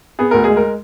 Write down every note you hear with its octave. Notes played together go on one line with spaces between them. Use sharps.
B3 G#4
D2 A#4
G#3 G#4
A#4